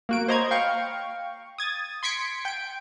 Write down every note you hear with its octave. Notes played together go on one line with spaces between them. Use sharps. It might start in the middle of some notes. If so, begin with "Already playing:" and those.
A#3 F#4 D7
C5 C#5 D#5 A#5 B5 G#6
F5 G5 C#6
D#6 G#6 A6
C6 G#6 B6 C#7 D7
G5 D7